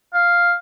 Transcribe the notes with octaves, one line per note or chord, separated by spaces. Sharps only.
F5